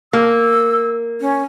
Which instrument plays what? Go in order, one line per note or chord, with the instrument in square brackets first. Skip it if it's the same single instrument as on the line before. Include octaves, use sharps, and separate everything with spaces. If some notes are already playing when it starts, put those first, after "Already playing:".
[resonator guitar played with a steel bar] A#3 [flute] E6
[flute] C#4